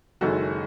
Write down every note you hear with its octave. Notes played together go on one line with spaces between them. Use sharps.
F#1 F#2 D#3 G#3 F#4 A4